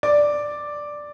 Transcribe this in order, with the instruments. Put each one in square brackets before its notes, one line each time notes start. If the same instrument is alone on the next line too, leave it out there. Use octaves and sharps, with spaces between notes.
[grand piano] D5 D6